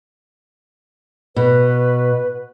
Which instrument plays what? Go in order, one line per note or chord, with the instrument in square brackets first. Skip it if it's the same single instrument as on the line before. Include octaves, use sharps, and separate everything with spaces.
[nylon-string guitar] B2 [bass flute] B4